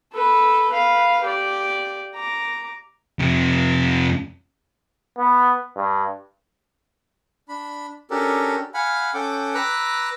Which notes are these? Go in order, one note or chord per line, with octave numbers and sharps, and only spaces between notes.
A4 B4
B4 F5
G4 D5
A#5 D6
F2 C3
B3
G2
D4 B5
C#4 D4 F#4 G4 A4 A#4
F5 F#5 G#5 B5
C#4 A4 F#5 G5 D6
B4 A#5 D6 E6 F#6